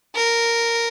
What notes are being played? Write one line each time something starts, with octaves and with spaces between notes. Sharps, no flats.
A#4